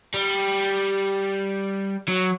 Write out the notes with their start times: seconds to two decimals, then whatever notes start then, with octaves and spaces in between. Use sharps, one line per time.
0.14 G3
2.09 F#3